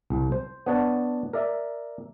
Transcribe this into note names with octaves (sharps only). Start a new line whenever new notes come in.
C2
C5
B3 D4 C#5 F#5 A5
A#4 D5 E5